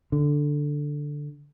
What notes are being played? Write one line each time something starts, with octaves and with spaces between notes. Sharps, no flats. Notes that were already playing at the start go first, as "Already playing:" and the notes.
D3